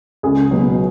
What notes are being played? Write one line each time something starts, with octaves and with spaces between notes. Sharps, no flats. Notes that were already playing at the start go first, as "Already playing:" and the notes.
C#2 G#4
B2 F#3